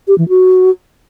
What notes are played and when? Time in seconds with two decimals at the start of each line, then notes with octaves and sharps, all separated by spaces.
0.08 G4
0.18 E3
0.29 F#4